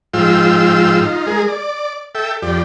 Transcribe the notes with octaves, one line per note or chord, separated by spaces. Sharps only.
G#2 F3 F4 G5 E6
D#4 F4
G#3 G#4 A#4
D5
A4 E5 G5
F2 G4 D5